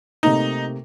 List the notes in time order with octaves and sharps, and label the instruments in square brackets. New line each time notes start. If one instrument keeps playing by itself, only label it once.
[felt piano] C3 A3 A#3 [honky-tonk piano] D#4